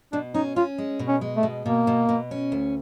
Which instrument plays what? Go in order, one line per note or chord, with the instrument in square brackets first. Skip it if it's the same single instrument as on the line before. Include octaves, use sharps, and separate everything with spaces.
[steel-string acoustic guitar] B2 [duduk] D4
[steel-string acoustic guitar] C#4 [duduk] D#4
[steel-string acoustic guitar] C#4 [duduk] F4
[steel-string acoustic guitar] G#3
B2
[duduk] C#4
[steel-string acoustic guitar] G#3
[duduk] A3
[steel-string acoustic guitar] B2
[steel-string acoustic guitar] B2 [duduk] A#3
[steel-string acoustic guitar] B2
B2
C#4
D2